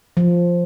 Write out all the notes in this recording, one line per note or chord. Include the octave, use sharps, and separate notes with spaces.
F3